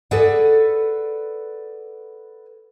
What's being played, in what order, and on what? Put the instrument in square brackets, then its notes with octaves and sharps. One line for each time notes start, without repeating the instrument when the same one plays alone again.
[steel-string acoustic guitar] G#4 A4 B4 D5 F#5